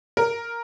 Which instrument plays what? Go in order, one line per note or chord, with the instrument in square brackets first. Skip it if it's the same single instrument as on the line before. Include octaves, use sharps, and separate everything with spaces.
[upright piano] A#4